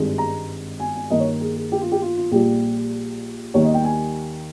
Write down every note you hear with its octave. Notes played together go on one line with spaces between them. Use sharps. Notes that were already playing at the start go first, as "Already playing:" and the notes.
Already playing: G#1 G2 D#3 G#3
A#5
G#5
G#5
G2 D#3 A#3 D#5
C#5
G#4
G#4
G4
F4
G4
F4
F4
A#1 A#2 G3 G4
D#2 D#3 G3 A#3 C#5
D#5
G5
G#5